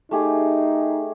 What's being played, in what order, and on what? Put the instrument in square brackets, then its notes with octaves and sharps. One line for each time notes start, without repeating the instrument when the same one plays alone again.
[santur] A3 G4 G#4 [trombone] D#4